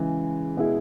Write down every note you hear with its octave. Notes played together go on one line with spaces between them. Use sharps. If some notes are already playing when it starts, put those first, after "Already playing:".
Already playing: C#3 E3 G#3
B2 G#3 B3 E4 G#4